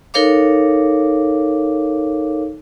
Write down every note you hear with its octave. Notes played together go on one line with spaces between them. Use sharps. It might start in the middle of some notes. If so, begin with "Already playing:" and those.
D#4 A4 A#4 C#5 F5 D6